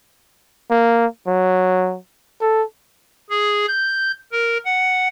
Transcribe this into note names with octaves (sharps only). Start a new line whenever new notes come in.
A#3
F#3
A4
G#4
G6
A#4
F#5